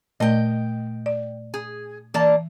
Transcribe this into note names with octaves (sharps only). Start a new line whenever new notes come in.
A#2 A3 D#5 G5
D5
G#4
E3 A#3 D5 A5